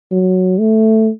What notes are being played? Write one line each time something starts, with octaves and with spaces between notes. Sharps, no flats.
F#3
A3